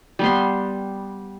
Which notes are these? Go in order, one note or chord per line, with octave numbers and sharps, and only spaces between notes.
G3 B3 C6